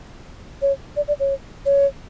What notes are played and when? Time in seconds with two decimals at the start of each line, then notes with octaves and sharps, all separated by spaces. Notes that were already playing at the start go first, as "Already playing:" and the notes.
0.62 C#5
0.96 D5
1.08 D5
1.20 C#5
1.66 C#5